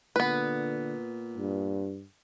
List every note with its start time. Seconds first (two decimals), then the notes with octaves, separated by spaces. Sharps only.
0.16 A#2 D3 B3 B4
1.37 G2